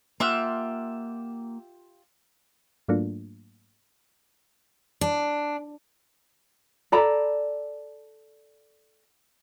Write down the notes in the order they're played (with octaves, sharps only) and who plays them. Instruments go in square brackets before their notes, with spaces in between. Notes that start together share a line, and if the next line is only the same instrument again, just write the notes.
[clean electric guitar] A#3 F#5 [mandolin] F4 G4 E5
[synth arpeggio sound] G#2 F#3 A3 A#3 D4 F4
[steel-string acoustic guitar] D4
[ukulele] A4 D5 A#5 B5